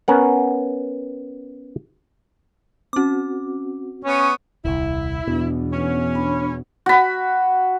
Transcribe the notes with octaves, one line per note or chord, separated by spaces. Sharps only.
B3 C#4 A#4 F#5
C4 C#4 F#4 D6
B3 C#4 C#5
D#1 C2 E4
E2 B2 E3 B3 D4
C#4
D4 B5
F#4 B5